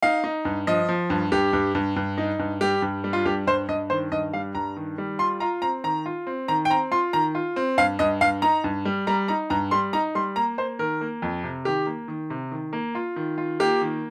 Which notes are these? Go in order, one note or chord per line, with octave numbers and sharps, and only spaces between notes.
D#4 F5
D#4
G2
F3 D#5
F3
G2
G2 G4
G2
G2
G2
D#4
G2
G3 G4
G2
G3
F4
G2 G4
G2 C5
G2 D#5
D#3 C5
G2 D#5
G3 F5
G2 A#5
D#3
G3
F4 C6
F4 A#5
C4 A#5
D#3 A#5
F4
C4
D#3 A#5
G5
C4 A#5
F4 C6
D#3 A#5
F4
C4
G2 F5
G2 D#5
G2 F5
D#4 A#5
G2
G3
G3 A#5
D#4 A#5
G2 A#5
G3 C6
D#4 A#5
G3 C6
A#3 A#5
A#3 C5
D#3 A#4
A#3
F2
C3
D#3 G4
A#3
D#3
C3
D#3
A#3
F4
D#3
F4
A#3 G4
D#3